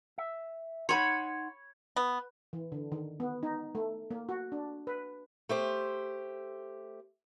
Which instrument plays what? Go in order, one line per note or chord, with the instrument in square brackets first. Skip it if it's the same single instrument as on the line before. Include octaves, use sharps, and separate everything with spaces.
[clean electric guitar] E5
[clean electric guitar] D#4 F#5 C6 [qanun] C#5 B5
[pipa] B3
[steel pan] E3
D3
D#3
B3
D#4
A3
A#3
F#4
D4
B4
[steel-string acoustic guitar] A3 G4 C5